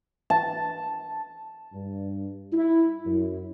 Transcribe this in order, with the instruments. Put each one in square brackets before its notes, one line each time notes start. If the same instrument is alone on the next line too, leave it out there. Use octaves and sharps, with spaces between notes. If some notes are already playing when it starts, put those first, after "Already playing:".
[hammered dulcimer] A5
[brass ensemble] G2
E4
F#2